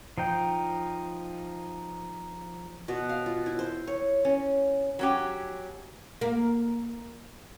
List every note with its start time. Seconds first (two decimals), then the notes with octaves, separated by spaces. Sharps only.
0.18 F3 D#4 G5
2.88 B2
3.09 F5
3.26 F4
3.46 E4
3.59 C5
3.87 C#5
4.25 C#4
4.99 F#3 C#4 G4
6.21 A#3